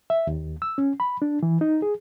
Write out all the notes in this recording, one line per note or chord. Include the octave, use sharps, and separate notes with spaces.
E5
D#2
E6
C#4
B5
D4
E3
D#4
G#4